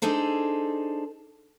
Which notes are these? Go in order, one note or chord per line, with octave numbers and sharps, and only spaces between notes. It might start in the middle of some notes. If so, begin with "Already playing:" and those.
D4 D#4 G#4 A4 C5